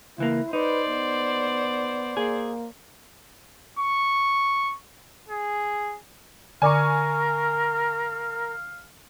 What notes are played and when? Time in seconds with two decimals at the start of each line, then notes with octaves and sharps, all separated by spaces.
0.18 C#2 E3 A#3 E4
0.53 D#4 B4 C5 D5
0.89 B3
2.17 A#3 G#4
3.79 C#6
5.28 G#4
6.62 D3 A#4 D5 F5 G#5 C#6 D6